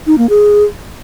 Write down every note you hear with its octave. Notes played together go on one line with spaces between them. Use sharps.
D#4
A#3
G#4